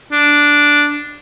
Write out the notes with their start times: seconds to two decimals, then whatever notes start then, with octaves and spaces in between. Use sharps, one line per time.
0.12 D4